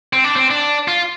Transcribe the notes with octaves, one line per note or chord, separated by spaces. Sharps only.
C4
D4
C4
D4
F4